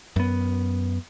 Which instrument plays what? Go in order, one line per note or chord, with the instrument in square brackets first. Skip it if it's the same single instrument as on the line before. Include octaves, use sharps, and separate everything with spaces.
[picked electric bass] F#2 B3